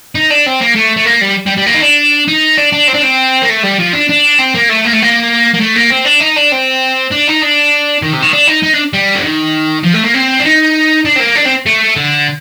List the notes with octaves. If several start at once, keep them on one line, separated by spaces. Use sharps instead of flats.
D#4
D4
C4
A#3
A3
A3
A#3
G3
G3
G3
A#3
D#4
D4
D#4
D4
D4
C4
D4
C4
A#3
A3
G3
F3
D4
D4
C4
A#3
A3
A#3
A3
A#3
A#3
A3
A#3
C4
D4
D#4
D4
C4
D4
D#4
D4
D#3
C3
D#3
D4
D#4
D#4
D4
G3
D3
D#3
F3
A3
A#3
C4
D4
D#4
D4
C4
A#3
D4
C4
A3
D3